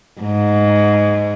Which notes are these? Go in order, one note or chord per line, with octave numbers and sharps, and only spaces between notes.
G#2